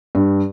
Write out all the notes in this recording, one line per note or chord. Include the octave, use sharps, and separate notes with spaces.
G2